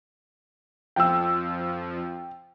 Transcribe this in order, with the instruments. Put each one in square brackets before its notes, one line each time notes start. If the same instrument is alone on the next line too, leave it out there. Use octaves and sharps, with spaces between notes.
[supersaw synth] F2 F3 [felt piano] G5 E6